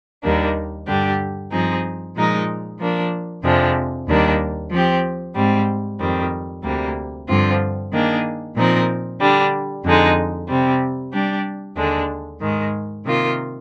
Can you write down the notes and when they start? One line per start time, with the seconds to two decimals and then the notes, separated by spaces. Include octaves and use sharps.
0.23 D#2 D#3 G3 A#3 D4
0.87 G2 D3 G3 D4 G4
1.51 G2 F3 C4 D#4 G#4
2.15 A#2 F3 G#3 D#4 A#4
2.79 F3 A#3 D4
3.43 F2 C3 F3 G#3 D4
4.07 D#2 D#3 G3 A#3 D4
4.71 F3 C4 G4
5.35 G#2 G3 C4
5.99 F2 D#3 G3 C4
6.63 D2 C3 G3 A#3
7.28 G2 D3 F3 C4 F4
7.92 D#3 A#3 D4 G#4
8.56 A#2 F3 C4 D#4 A#4
9.20 D3 G3 D4
9.84 F2 D3 G#3 D#4
10.48 C3 G3 C4
11.12 G3 D4 G4
11.76 D#2 D3 G#3 D4
12.41 G#2 D#3 G#3
13.04 C3 D#3 A#3 F4